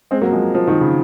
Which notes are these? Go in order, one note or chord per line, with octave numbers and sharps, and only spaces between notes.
G#3 C4
F#3 A#3
F3 G#3
F3
D#3
C#3